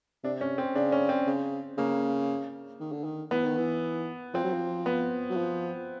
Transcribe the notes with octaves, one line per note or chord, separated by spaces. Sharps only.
C3 D4
C#4
C4
C#3 D4
C#4
C4
C#3
C#3 A#3
D#3
D3
D#3
E3 B3
D#3
E3
F3 C4
F#3
F3
B3
F#3
F3